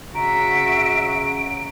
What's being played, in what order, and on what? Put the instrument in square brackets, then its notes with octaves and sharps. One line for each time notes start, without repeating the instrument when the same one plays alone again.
[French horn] C#3 [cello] F#4 E5 [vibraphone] A#5 [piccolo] D7